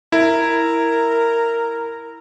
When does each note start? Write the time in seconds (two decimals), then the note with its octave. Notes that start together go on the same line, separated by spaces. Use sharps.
0.12 E4 A#4